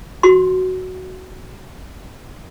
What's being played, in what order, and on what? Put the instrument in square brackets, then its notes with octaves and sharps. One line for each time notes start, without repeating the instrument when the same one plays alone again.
[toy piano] F#4 C6